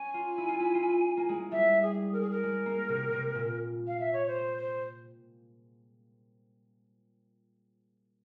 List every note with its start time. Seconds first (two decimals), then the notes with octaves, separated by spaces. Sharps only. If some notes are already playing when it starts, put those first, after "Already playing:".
Already playing: C#4 G#5
0.14 F4
0.38 E4
0.48 F4
0.60 E4
0.75 F4
0.83 E4
1.17 A#3
1.29 G#3
1.52 G3 E5
1.82 G#4
2.13 A#4
2.21 G#4
2.31 A#4
2.43 G#3
2.66 A#3
2.89 C3
3.12 C3
3.35 A#2
3.87 F5
4.00 E5
4.13 C#5
4.27 C5
4.58 C5